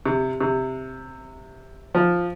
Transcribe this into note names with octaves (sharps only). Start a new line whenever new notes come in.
C3
C3
F3